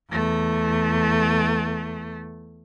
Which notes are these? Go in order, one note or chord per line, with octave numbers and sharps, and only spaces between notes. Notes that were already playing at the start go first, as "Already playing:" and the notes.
E2 A3